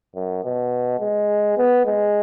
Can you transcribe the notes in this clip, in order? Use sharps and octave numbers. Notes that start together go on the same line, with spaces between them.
F#2
B2
G#3
B3
G#3